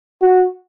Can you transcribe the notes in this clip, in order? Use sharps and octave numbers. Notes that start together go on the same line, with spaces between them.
F#4